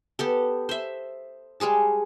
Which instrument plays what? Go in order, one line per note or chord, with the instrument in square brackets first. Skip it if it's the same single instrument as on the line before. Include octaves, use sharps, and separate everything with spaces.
[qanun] B3 G4 A4
C5 E5
G3 G#3 G#4 A5